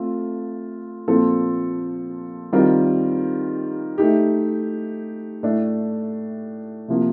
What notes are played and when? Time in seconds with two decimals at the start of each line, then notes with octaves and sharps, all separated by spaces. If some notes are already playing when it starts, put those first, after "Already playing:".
Already playing: A3 C4 F4 A4
1.08 A#2 F3 C4 F4 A4
2.53 D#3 G3 C4 F4 A#4
3.98 A3 D#4 G4
5.43 A2 A3 D4
6.88 C3 F3 A#3